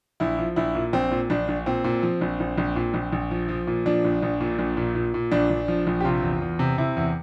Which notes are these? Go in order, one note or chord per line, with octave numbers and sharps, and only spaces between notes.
A#1 E4
F3
A#1 E4
A#2
A#1 C4
A#2
A#1 D4
A#1
A#2 C4
A#2
F3
A#1
A#1
A#1
A#2
A#1
A#1
F3
F3
A#2
F3 D4
A#1
A#1
A#2
A#1
A#2
A#2
A#2
A#1 D4
A#1
F3
A#1
G4
C3 F4
E2
E2
C3
C3 E4
E2